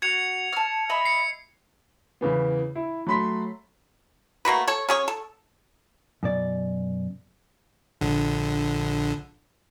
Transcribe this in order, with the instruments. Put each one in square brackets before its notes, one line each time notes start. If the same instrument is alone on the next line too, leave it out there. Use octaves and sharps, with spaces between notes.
[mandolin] F#4 [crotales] G#6 C#7 F7
[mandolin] A5 F6
D#5 E5 B5
[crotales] C7 C#7
[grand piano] E2 C#3 E3 B3
E4
F#3 A3 B5 C6 B6
[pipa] A3 A#3 F#4 B4
A4 C#5
C#4 G#4 C#5
A4
[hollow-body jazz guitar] F#2 B2 D5
[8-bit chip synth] A#1 D3